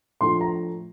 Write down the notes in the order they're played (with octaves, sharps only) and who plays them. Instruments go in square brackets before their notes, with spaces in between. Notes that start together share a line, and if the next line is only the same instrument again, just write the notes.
[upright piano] A2 F3 A3 D4 C6
A#5